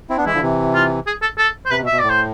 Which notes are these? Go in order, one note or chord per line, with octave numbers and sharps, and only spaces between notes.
C4 E4
B3 D4
E3 G#3 E4
D3 F3
C3 E3
F4
G#4
A4
A4
C5
C3 B4
B2
E5
B2
A2 D5
C5